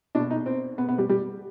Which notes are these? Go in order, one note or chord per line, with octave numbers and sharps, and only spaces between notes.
B2 D4
D#4
C4
B3
B3
G3
G3